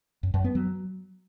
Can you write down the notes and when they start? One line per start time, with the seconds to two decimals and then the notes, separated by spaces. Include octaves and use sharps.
0.23 F#2
0.34 F#2
0.44 B3
0.55 F#3